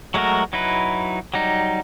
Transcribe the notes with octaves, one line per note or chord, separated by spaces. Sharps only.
F#3 G#3 A3 F#4 A#4
F#3 D#4 E4 B4
F#3 G3 D#4